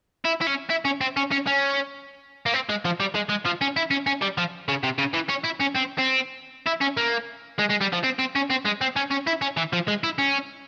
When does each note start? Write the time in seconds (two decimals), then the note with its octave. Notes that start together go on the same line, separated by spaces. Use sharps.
0.25 E4
0.41 E4
0.47 C#4
0.70 E4
0.85 C#4
1.01 C4
1.17 C#4
1.31 C#4
1.47 C#4
2.46 A#3
2.54 C4
2.69 G#3
2.85 F3
3.00 G3
3.15 G#3
3.30 G#3
3.46 F3
3.61 C#4
3.76 E4
3.91 C#4
4.07 C#4
4.22 G3
4.38 F3
4.68 C#3
4.83 C3
4.98 C#3
5.13 E3
5.29 C#4
5.44 E4
5.60 C#4
5.75 C4
5.98 C4
6.67 E4
6.81 C#4
6.97 A#3
7.59 G#3
7.70 G#3
7.81 G3
7.93 F3
8.04 C4
8.19 C4
8.35 C#4
8.50 C4
8.65 G#3
8.81 C4
8.96 C#4
9.11 C#4
9.27 E4
9.42 C#4
9.57 E3
9.73 F3
9.88 G#3
10.04 E4
10.18 C#4